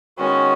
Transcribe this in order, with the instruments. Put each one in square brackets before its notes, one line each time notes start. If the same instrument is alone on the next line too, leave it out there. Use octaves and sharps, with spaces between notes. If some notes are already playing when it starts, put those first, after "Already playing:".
[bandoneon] D#3 G#3 B3 F#4 [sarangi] C#4